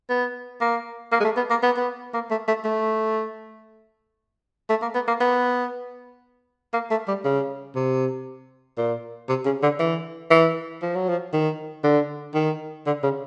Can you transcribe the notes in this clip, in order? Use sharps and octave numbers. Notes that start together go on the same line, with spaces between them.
B3
A#3
A#3
G#3
A3
B3
A#3
B3
B3
A#3
A3
A3
A3
A3
A#3
B3
A#3
B3
A#3
A3
G3
C#3
C3
A#2
C3
C#3
D3
E3
E3
F3
F#3
F3
D#3
D3
D#3
D3
C#3